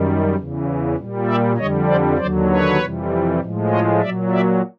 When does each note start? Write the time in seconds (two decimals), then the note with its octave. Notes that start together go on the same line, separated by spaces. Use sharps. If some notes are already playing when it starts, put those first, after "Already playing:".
Already playing: F#2 D#3 G3
0.35 E2 C#3 E3
0.96 A#2 G3
1.26 D5 E5
1.57 F2 D3 G3 C#5 D#5
1.87 C5 D5
2.18 D#2 D3 F#3 C5 D5
2.49 B4 C#5
2.79 F2 C3 E3 G3
3.40 A2 F3 G#3
3.71 C#5 D#5
4.00 A#2 F#3 D5 E5
4.32 D5 E5